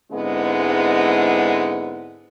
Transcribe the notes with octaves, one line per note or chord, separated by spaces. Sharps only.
G#2 D3 G#3 B3 C4 E4